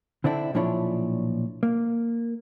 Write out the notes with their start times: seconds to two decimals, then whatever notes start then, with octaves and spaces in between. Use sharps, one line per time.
0.24 D3 C4 D4 E4
0.53 B1 A#2 F3 D4 E4 C#5
1.63 A#3